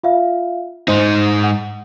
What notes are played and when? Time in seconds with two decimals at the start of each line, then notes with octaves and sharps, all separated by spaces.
0.03 F4 E5 F5
0.88 G#2 D#4 C5 C6
1.44 F#5